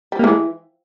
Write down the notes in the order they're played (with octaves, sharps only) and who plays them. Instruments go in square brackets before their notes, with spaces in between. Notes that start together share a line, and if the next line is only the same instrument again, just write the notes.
[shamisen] G3
[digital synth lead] A#3
[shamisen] E3 [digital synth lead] G#3